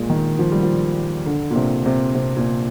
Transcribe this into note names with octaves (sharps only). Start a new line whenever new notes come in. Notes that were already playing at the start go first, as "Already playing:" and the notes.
Already playing: A#2 G#3
D#3
F3
G3
F3
D3
A#2
C3
C3
C3
A#2